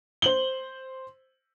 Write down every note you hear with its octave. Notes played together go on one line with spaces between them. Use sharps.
C5 F#7 G7